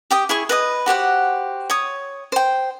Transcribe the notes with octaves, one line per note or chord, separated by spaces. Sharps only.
G4 G5 D#6
E4 G#4 C#6
B4 D#5 D#6
F#4 G4 C5 F#5
C#5 D#6
C5 G5